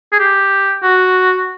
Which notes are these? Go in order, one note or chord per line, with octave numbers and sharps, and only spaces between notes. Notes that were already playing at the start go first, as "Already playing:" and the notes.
G#4
G4
F#4